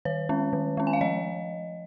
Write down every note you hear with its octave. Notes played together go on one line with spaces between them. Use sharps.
D#3 C#5
G#3 C#4
D#3
G#3 C#4
G#5
F5
F3 D#5